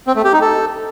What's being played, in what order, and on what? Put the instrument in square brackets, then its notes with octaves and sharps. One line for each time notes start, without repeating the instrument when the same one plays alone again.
[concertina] C4
A3
G4
D#4
A4